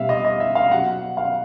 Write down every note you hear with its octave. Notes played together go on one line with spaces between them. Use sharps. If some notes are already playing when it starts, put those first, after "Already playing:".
Already playing: B2 G3 E5 F5
D#5
D#5
E5
F5
B2 F#3 F#5
F5